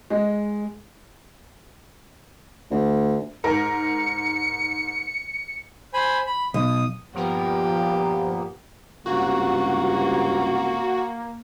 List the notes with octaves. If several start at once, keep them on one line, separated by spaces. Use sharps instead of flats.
G#3
D2
G#2 A#4 C#7
C5 G#5 B5
B5
B1 D#6
G2 A#2 F3 A#3 B3 G4 A#4
C#2 G2 C3 A#3 F#4